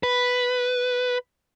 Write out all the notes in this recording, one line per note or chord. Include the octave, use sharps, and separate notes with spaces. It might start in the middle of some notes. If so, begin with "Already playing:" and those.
B4